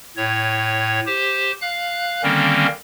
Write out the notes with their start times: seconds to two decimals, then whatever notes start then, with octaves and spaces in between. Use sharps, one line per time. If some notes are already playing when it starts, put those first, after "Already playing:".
0.17 A2 C#5
1.06 G4 C5
1.61 F5 F#6
2.23 D3 D#3 G3 A#3 C4 C#4